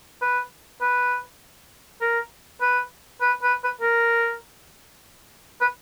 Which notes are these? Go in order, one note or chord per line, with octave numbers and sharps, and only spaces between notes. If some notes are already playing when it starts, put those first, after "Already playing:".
B4
B4
A#4
B4
B4
B4
B4
A#4
B4